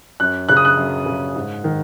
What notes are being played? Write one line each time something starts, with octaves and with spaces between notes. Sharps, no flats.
F#2 F#6
C#3 F#6
D#6
F#6
F#2
C#3
G#2
D#3